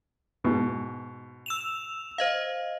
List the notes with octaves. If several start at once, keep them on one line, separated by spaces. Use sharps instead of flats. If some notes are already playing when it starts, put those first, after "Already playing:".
G#2 B2
E6 E7 F7
C5 D#5 F5